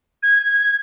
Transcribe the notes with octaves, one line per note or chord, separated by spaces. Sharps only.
G#6